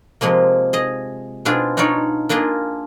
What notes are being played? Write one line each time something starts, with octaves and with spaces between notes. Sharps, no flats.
C3 F3 G#3 A#3
G#4 D#5
B2 C4 D4 F4 G#4
D4 D#4 F4 C#5 D5
A#3 D4 F4 G#4 D#5